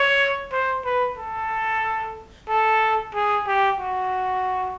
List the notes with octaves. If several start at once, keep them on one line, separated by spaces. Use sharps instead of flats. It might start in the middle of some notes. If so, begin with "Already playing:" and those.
Already playing: C#5
C5
B4
A4
A4
G#4
G4
F#4